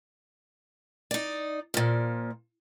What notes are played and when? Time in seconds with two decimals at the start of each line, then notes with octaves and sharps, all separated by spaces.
1.11 D#4 D5
1.74 A#2 F3